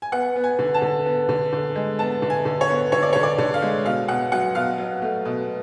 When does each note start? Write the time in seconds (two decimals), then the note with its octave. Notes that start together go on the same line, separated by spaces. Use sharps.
0.02 G#5
0.12 B3 F#5
0.36 B3
0.44 G#5
0.59 D3
0.74 A5
0.82 D3
1.05 B3
1.29 D3
1.53 D3
1.76 G#3
1.99 B3 A5
2.22 D3
2.30 G#5
2.45 D3
2.61 C#5
2.68 B3
2.92 D3 C#5
3.02 D5
3.13 D3 C#5
3.23 D5
3.38 D3
3.54 F5
3.62 G#3
3.85 B2 F5
4.08 B2 F#5
4.32 F#3 F#5
4.55 B2 F5
4.78 F#3
5.02 A3
5.25 B2